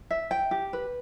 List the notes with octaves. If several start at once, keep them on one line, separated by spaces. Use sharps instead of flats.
E5
G5
G4
B4